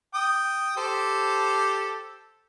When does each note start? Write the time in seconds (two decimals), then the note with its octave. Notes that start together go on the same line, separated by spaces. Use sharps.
0.14 G5 D#6
0.77 G4 A4 C5